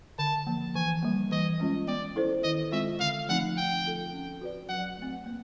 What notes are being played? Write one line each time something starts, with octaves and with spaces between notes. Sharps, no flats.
D3 A5
F3 A#3
E3 G#5
G3 A#3
E3 D#5
G#3 C#4 F4
B3 D5
E4 A4 C5
D#3 D#5
G#3 C4 F4 A4 E5
D3 F5
F3 A3 C4 D#4 F#5
C4 G5
F4 A4
C#4
F#4 B4 D5
F#3 F#5
A3 C4
A#3